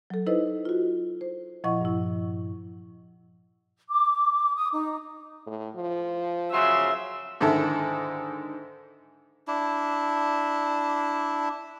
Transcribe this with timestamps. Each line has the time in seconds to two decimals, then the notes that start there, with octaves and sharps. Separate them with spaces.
0.10 F#3 A4
0.26 D#4 E4 A4 B4 C5 D#5
0.65 F4 F#4
1.21 C5
1.64 A#2 F3 E4 D#5 F#5 C#6
1.81 G2 E4
3.90 D6
4.55 D#6
4.73 D#4
5.47 A2
5.76 F3
6.52 C#3 F#3 E5 C6
7.41 G#2 D3 D#3 E4 A4
9.48 D4 E4